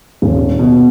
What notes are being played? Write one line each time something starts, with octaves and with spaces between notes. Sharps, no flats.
D#1
B2